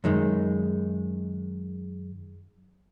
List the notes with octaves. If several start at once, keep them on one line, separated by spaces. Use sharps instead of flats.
F#2 D#3 G#3